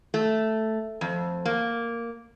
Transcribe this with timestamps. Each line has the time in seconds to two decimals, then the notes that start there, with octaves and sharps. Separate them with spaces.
0.14 A3
1.01 F2
1.45 A#3